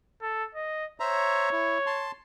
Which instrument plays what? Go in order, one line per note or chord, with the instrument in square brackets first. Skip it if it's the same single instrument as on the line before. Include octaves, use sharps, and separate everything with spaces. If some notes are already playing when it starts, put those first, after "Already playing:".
[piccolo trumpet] A4
D#5
[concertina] C5 E5 A#5 [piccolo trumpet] C#5
[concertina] E4
A5 C6